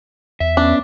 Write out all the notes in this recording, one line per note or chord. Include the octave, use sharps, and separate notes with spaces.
E2 E5
B3 C#4 D4